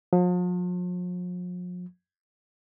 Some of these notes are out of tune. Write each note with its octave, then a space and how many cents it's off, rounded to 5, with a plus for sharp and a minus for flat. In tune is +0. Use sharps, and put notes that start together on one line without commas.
F3 +45